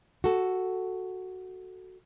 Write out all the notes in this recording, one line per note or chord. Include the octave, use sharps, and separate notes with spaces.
F#4 A4